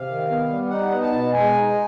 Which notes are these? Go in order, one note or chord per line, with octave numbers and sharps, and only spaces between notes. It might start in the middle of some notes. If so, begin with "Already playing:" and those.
Already playing: C3 F5
D#3
B3
G3
D#4 F#5
B3
A5
B2
G#3 G#5
D#4